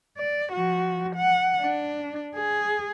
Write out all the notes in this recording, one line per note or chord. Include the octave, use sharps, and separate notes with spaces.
D5
F3 F#4
F#5
D4
G#4